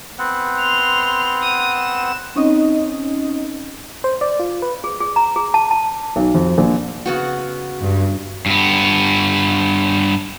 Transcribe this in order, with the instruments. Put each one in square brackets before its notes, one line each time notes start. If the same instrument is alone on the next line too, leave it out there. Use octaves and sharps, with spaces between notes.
[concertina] B3 C4 F#5
[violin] C6 F7
D#6
E7
[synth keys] C4 C#4 D#4 D#5
[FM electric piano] C5
D5
F4
B4
[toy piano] G#4
G#4
A#5
G#4
A5
A5
[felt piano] B1
F2
A#1
[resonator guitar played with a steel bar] C#3 B3 F#4
[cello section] G2
[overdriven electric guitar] G2 B3